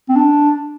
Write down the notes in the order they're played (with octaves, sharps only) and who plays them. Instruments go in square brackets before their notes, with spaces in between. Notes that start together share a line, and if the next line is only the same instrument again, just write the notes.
[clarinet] C4
D4